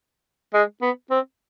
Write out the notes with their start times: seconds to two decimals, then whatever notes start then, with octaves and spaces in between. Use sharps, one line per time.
0.54 G#3
0.82 B3
1.10 C4